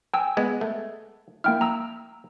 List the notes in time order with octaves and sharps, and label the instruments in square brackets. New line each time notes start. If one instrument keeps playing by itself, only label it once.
[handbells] G5 G#5 E6
[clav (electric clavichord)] G#3 B3
A3
[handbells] A#3 G5 F6 [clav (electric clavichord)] E4
[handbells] A#5 E6